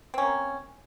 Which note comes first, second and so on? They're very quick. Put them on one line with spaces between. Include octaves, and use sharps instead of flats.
C4 C#4 A#3